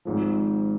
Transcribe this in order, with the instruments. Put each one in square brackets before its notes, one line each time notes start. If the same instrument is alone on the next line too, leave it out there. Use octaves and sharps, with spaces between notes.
[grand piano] G#1 G#2 F3